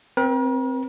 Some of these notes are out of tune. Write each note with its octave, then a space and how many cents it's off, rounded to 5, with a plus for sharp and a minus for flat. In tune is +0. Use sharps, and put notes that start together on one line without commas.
C4 +0 A#4 +45